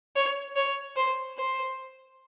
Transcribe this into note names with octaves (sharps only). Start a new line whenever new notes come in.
C#5
C#5
C5
C5